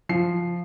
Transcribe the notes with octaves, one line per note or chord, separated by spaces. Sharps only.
F3 C7